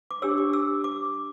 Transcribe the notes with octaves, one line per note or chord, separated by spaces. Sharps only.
D6
D4 G4 C#5 E6
D6
E6
D6